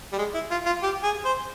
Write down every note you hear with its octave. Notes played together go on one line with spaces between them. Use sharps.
G3
G#3
E4
F4
F4
G4
G#4
C5